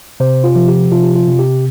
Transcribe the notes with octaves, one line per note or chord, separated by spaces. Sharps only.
C3 C5
F4
F3
G4
C3 F4
G4
F4
C3
G4